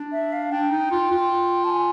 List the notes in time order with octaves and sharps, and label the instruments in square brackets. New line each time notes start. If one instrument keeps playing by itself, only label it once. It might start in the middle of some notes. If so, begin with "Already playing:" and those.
Already playing: [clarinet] D4
[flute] E5
F5
[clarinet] D4 [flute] G5
[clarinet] D#4
F4
F4
[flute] A5
G#5